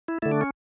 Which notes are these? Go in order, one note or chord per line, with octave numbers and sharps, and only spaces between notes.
E4
D3 A3 E4
D4
C#4